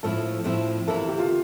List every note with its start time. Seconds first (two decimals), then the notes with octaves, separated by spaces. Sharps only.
0.03 A2 F3 A3 C4 E4 A4
0.44 A2 F3 A3 C4 E4
0.88 C3 E3 A#3 E4 A4
1.08 G4
1.19 F4